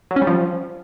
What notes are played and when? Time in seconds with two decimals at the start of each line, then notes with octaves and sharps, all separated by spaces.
0.11 F#3
0.16 C#4
0.22 G3
0.27 F3